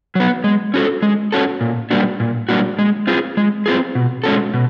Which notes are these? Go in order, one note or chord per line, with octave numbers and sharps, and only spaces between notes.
F#3 B3
G#3
C#4 F#4 A4
G#3
C#4 F#4 A4
A#2
G3 A#3 D4 F#4
A#2
G3 A#3 D4 F#4
G#3
C4 F4 G#4
G#3
C4 F4 G#4
B2
G#3 C#4 F#4 A4
B2